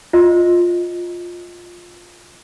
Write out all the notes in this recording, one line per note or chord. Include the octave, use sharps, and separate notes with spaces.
F4 D#5